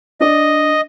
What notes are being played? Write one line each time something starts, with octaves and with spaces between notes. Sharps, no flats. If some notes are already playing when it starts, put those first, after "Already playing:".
D4 D5 D#5